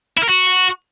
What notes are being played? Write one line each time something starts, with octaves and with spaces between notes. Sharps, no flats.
E4
A#4
F#4